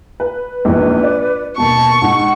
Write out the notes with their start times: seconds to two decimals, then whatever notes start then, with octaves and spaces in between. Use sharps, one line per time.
0.20 B4
0.65 A#1 E2 G#2 B4
1.04 D5
1.58 D#2 B2 A5 C#6
2.02 G#2 F#5